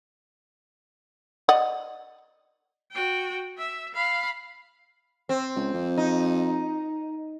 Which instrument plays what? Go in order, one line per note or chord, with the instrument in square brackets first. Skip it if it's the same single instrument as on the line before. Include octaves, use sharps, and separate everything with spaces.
[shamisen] D5 D#5 F#5
[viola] F#4 G5
E5
F5 B5
[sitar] C4
[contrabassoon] C#2
F2
[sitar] D#4